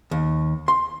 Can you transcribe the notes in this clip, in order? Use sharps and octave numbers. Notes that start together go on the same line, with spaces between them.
D#2
C6